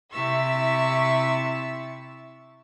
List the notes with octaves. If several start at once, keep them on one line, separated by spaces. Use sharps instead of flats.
C3 E4 E5 C#6 E6 A6